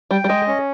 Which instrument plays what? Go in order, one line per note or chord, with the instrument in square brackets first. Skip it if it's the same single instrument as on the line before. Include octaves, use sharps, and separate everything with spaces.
[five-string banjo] G3 [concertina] G5
[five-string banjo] G3
[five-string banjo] G#3 [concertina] D#5
[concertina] C#4